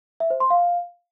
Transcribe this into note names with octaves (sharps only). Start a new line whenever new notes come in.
E5
C5
C6
F5